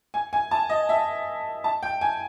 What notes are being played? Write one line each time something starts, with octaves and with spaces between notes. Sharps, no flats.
G#5
G#5
A5
D#5
E5
A5
G5
G#5